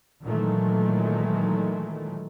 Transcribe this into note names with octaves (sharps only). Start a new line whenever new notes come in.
A#2 D#3 E3 F#3 G#3 A3